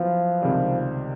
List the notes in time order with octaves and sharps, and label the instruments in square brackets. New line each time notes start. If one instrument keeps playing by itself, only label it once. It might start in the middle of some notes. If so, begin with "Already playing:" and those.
Already playing: [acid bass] F3 [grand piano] F#3 B3 E4
[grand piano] C#2 C3 D#3 G3 C4